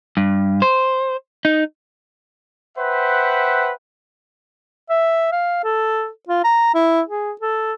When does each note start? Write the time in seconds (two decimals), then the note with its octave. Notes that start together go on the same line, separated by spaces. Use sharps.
0.17 G2
0.62 C5
1.45 D#4
2.78 B4 C5 E5 F#5 G5
4.90 E5
5.32 F5
5.64 A4
6.29 F4
6.44 A#5
6.74 E4
7.07 G#4
7.41 A4